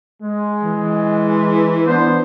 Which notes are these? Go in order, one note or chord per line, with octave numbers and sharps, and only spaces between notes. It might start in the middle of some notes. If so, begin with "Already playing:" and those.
G#3
E3
B3 D4 C5